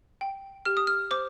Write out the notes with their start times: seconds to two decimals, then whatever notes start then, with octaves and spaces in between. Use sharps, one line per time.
0.21 G5
0.65 G4 F6
0.77 D#6
0.87 F6
1.11 C5 D6